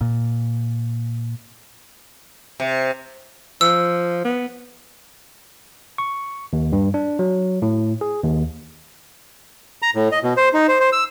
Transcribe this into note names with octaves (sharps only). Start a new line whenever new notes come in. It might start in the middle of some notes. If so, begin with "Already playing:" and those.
A#2
C3
F3 E6
B3
C#6
D#2
G2
D4
F#3
A2
G#4
D#2
A#5
A2
D#5
B2
C5
D#4
C5
C5
E6